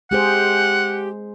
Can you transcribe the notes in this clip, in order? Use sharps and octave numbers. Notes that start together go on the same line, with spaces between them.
G#3 G4 G#4 C5 F#5